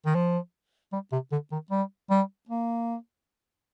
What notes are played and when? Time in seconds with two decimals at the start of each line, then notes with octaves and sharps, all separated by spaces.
0.06 D#3
0.15 F3
0.92 G3
1.12 C3
1.32 D3
1.52 D#3
1.71 G3
2.10 G3
2.49 A#3